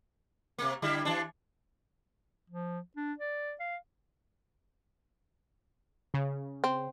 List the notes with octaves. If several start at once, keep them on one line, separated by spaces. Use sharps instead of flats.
C3 A#3
D3 G3 E4
E3 D4
F3
D4
D5
F5
C#3
C4